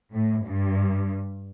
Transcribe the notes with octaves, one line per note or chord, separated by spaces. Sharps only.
A2
G2